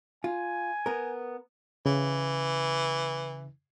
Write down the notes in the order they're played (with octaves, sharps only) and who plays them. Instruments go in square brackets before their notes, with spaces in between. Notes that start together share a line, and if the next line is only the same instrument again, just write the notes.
[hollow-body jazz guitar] F4 [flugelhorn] G#5
[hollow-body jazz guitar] B3 A#4
[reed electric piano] C#3 [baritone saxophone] E3